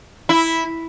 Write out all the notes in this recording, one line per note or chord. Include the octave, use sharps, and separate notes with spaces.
E4